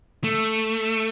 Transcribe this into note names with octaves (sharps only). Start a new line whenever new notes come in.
A3